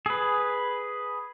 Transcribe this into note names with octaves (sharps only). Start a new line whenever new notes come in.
G#4 B4